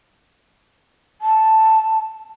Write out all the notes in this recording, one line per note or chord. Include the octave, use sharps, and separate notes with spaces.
A5